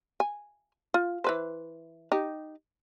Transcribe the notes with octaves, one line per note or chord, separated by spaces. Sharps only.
G#5
F4
E3 B4 C5
D#4 G4